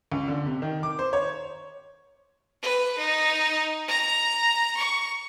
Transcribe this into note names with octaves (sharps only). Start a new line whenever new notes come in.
C#2
D3
C3
D#3
D6
C5
C#5
B4
D#4
A#5
C#6